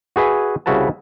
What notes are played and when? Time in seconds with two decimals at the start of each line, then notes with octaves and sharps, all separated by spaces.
0.16 F#4 G#4 B4 E5 G#5
0.66 C2 C#3 E4 F#4 B4 A5